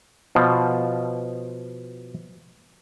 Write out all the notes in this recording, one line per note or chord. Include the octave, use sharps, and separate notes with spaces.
B2 F3